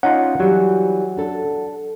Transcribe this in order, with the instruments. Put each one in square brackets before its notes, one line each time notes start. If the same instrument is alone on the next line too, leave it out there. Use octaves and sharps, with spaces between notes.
[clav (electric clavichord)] C#4 D#4 F4 [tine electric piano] F#5
[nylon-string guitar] E3 G3 [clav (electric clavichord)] F#3
[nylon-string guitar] D4 A4